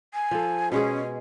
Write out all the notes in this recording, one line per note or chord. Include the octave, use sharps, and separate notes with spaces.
G#5
F3 A4
B2 G#3 C#4 G#4